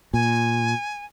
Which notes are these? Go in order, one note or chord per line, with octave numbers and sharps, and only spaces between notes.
A#2 G#5